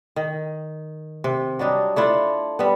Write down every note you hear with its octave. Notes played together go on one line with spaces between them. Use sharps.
D#3
C3
F#3 G3 D4 D#4
A3 D4 E4 F4
G3 B3